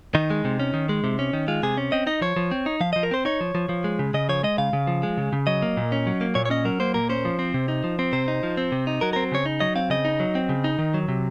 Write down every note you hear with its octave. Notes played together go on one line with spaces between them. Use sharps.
D#3 D#4
G#3
C3
C#4
D#3
G#3
C3
C#4
D#3
G#3 F4
C3 G#4
C#4
C4 D#5
D#4 D#5
F3 C#5
F3
C4
D#4
F3 F5
F3 D#5
A#4
C4 C5
D#4 C#5
F3
F3
F3
G#3
C#3
C#3 D#5
F3 C#5
G#3 D#5
C#3 F5
C#3
F3
G#3
C#3
C#3
F#3 D#5
A#3
A#2
C#4
F#3
A#3
A#2 C#5
C#5
C#4 D#5
F#3 A#4
A#3 C5
A#2 A#4
C#4 C5
F3
C4
C3
D#4
F3
C4
C3 C5
D#4
F3
C4
C3
D#4
F#3 A#4
C4 A#4
C#3 C#5
D#4
F#3 D#5
C4 F5
C#3 D#5
D#4
F#3
C4
C#3
D#4
D#3
F#3
C3